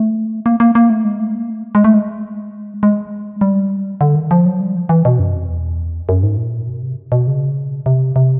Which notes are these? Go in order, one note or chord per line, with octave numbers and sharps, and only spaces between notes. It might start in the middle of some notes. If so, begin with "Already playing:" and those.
Already playing: A3
A#3
A#3
A#3
A3
G#3
A3
A#3
A3
G#3
A3
G#3
G#3
G3
D3
D#3
F3
F#3
G3
F3
E3
B2
F#2
F2
E2
F#2
G#2
A#2
B2
C3
B2
C#3
C3
C3